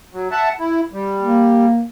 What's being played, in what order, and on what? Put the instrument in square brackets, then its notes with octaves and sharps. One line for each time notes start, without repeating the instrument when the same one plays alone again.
[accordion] F#3
E5 F#5 A5
E4
G3
[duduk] A#3